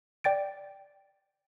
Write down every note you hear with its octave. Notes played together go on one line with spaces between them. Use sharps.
D5 G5 A6 D7